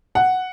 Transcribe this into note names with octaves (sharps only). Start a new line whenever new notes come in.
F#5